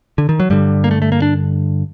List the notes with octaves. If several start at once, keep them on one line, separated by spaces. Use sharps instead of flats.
D3
D#3
F#3
G2 D3 G3
A#3
A3
A3
A#3
D4